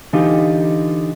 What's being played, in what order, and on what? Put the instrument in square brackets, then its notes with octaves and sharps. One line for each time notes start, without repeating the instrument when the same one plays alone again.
[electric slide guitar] D3 E3 D#4 F4 G4